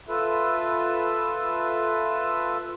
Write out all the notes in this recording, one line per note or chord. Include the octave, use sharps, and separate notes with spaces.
F4 A4 B4 E5